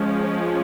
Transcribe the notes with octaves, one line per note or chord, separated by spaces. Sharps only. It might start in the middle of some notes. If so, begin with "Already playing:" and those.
Already playing: F3 G#3 C#4